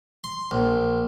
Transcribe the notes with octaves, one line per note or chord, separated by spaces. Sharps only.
C6
A#1